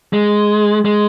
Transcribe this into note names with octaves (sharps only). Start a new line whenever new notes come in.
G#3
G#3